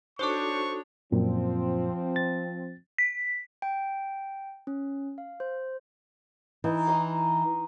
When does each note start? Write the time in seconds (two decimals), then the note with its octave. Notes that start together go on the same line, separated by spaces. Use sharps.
0.19 D4 D#4 F#4 A4 C5 C#5 C#6 D6
1.12 F#2 A#2 F3 C4
2.16 A6
2.98 B6
3.62 G5
4.67 C#4
5.18 F5
5.40 C5
6.64 E3 D#4
6.87 D#5 A#5 C6